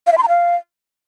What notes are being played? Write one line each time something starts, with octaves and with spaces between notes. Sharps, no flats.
F5
E5
C6
A#5
F5